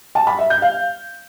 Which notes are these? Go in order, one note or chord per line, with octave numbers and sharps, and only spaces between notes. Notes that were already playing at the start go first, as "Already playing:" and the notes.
A5
B5
E5
G6
F5